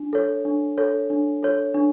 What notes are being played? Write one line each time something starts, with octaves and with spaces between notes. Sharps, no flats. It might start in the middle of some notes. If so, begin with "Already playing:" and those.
Already playing: D4
A4 C#5
D4
A4 C#5
D4
A4 C#5
D4